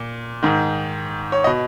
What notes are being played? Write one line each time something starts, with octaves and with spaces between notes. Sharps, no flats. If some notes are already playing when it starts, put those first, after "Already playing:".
Already playing: A#2
G#2 D#3
C#5
D#5
B2